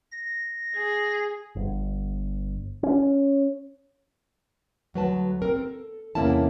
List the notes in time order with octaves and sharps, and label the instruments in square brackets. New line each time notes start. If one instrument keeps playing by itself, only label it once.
[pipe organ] A#6
[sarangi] G#4
[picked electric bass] G1
C#4
[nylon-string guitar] D2 F#3 B4 A5
C4 A#4
A4
E2 C3 A#3 C#4 E4 A5